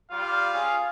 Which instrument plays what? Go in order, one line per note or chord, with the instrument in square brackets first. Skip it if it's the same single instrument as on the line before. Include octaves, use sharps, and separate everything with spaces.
[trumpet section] G3 F4 [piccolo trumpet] F5
[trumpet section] C#4 F4 G#4